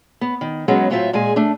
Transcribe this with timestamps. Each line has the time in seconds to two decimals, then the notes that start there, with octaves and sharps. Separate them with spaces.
0.21 B3
0.41 D#3
0.68 F#3 G#3 B3 C#4
0.90 A2 F#3 C4 F4 E5
1.13 A#2 G#3 G#4 G#5
1.36 A3 D4